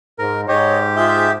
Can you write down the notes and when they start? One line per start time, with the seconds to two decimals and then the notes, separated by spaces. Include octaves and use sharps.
0.19 G#2 A#4
0.48 G#2 G4 C#5 D#5
0.96 F4 G#4 E5 G6